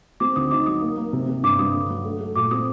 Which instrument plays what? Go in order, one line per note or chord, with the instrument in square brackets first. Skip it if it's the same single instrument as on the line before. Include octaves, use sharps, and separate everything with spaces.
[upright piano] C4 [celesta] D6
[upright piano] D2 [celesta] D#6
[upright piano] D#4 [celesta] D6
[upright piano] F#3 [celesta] D#6
[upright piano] A#3
A#3
C3
C3
[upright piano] G2 [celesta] D6
[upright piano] G2 [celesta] D#6
[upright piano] D3
F#3
A3
A3
[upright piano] A#2 [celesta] D6
[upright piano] C4 [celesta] D#6